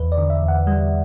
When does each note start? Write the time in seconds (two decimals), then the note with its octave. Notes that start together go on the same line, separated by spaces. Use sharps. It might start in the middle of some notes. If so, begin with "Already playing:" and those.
Already playing: E2 B4
0.12 D5
0.18 D3
0.30 E5
0.42 E2
0.48 F#5
0.67 G3